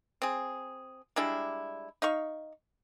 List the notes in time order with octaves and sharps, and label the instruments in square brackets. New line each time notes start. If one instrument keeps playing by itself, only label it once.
[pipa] C4 G#4
G3 G#3 D4 E4
D#4 F5 C#6